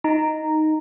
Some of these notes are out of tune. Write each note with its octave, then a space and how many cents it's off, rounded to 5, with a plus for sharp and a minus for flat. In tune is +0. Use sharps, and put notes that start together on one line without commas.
D#4 +0 A#5 -10